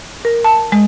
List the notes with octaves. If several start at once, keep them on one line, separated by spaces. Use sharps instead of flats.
A#4
A5
G#3